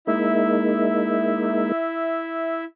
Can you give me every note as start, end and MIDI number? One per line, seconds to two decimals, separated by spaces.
0.07 1.72 56
0.07 1.72 58
0.07 1.72 63
0.07 2.64 64
0.07 2.64 76